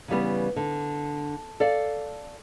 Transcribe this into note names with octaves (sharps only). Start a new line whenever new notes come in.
C#3 E3 G3 B3
D3
A4 D5 F5